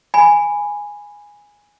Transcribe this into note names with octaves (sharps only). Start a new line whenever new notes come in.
G#5 B5